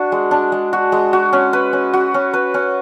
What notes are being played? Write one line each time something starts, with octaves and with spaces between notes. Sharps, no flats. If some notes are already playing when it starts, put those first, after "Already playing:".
Already playing: D4 F#4
G#3
D4
G#3
F#4
G#3
F#4
C#4
B4
C#4
F#4
C#4
B4
C#4